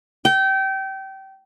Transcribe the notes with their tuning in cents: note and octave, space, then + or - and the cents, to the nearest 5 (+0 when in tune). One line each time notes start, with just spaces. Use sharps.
G5 -25